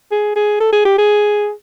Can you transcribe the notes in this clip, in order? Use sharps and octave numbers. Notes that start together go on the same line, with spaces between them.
G#4
G#4
A4
G#4
G4
G#4